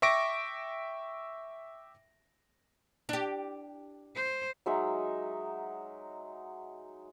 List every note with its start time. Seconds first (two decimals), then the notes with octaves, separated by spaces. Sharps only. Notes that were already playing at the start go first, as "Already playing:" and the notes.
0.02 E5 G5 C#6 D6 A#6 D7
3.09 D4 G4
4.15 C5
4.66 F#3 G#3 D#4 E5